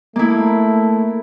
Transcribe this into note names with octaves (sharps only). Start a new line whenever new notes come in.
A3 A#3 E4